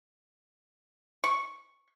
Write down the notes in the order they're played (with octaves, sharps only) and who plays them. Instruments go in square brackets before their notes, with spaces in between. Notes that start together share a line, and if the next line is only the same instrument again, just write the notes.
[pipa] C#6